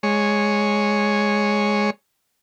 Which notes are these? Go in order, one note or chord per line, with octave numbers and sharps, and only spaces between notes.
G#3 C#5